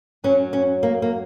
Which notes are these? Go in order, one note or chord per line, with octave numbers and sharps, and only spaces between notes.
F#2 F#3 C#4
C#4
A#3
A#3